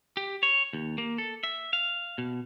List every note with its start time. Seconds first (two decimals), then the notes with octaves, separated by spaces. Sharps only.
0.17 G4
0.43 C#5
0.73 D#2
0.98 A#3
1.18 A4
1.44 E5
1.73 F5
2.18 B2